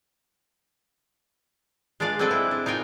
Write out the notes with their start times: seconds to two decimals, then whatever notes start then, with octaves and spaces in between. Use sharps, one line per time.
2.00 G#3 D4 F4 D5 F5
2.19 C4 D4 G#4 A4 B4 G5
2.31 E4
2.51 D4
2.66 D#4 F4 A#4 G5 G#5